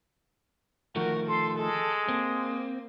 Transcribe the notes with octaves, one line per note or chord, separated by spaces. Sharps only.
D#3 F3 A3 F#4 A#4
A4 C6
G#3 A4
A#3 C4